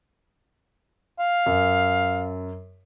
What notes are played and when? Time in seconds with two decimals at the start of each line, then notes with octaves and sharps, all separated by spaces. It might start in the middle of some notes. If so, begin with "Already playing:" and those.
1.19 F5
1.46 F#2